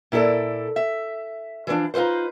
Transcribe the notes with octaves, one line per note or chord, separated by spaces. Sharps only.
A#2 E4 G4 A4 D5
E5
E3 F3 G3 D4 F4
D#4 F4 G#4 B4 C5